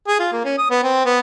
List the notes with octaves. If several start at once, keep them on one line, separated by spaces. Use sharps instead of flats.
G#4
F4
A#3
C#4
D#6
B3
C4
B3